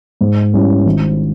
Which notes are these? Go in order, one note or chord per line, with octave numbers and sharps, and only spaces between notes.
G#2
G3 C#4 E4
G#1